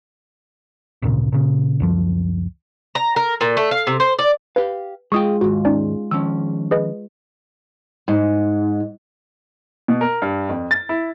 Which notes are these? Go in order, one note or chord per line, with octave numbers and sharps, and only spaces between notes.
G#1 D2 A#2 C#3
A#2 C#3
C#2 F#2 F3
A#5
A#4
A#2
A3
F5
C3
C5
D5
G4 B4 F5
G#3 F4 G#4 D#5 G5 C#6 D#6
D#2 G#2 F#4
C#4 D#4 D5
D#3 F3 C#4 E6
G#4 B4 D#5
G#2
B2
A#4
G2
F2
A6
E4